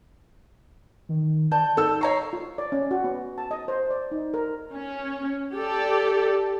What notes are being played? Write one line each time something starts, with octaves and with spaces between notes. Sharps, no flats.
D#3
D5 A5 G6
D#4 A4 E6
C#5 A#5 C#6 C7
F4
D5
C#4
F#4
B3
A5
D#5
C5
D5
D#4
A#4
C#4
G4 A4 D5